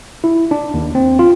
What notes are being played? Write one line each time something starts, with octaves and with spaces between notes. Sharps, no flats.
E4
D4
D#2
C4
F4